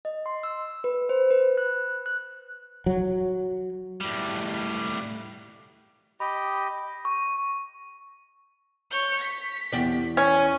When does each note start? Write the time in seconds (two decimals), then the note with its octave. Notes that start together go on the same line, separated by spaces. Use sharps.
0.05 D#5
0.26 C6
0.43 E6
0.84 B4
1.09 C5
1.31 B4
1.58 F#6
2.06 F#6
2.86 F#3
4.01 A2 G3
6.20 G4 D#5 B5
7.05 C#6
8.91 C#5 G6
9.21 B6
9.73 E2 G4 D5
10.17 C#4 G#5